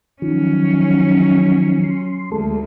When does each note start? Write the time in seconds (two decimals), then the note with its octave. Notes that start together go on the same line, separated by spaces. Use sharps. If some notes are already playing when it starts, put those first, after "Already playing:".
0.22 D#3 F3 F#3 C#4
1.84 C6
2.32 D2 G#3 A4